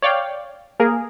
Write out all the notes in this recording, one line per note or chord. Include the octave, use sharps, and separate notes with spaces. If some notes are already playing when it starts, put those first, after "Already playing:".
C#5 D5 F5 G5
A#3 G#4 A#4